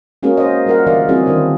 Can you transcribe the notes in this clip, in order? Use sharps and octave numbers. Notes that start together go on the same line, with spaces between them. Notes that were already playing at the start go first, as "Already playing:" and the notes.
G#3 A#3 C#4 F#4 G#4 A#4
C5 D#5
G3 F4 G#4 A#4 F5 F#5
D3 E3 A#4 D5 E5 F5
G3 C4 E4 F#4 G#4
D3 D#3 D4 C5